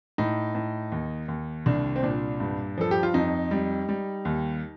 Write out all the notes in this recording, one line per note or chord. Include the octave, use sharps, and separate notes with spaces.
A2 D#4
A2
D#2
D#2
C2 D4
C4
A#2 D4
G2
F3 A4
G4
F4
F2 D#4
G3
G3
D#2